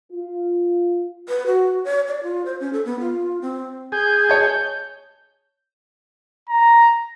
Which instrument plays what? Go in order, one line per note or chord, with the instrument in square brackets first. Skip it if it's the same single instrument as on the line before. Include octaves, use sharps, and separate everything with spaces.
[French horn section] F4
[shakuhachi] B4
F#4
C#5
D5
F4
C5
C#4
A4
B3
F4
C4
[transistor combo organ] G#4 [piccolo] G6
[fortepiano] C#5 A5
[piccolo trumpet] A#5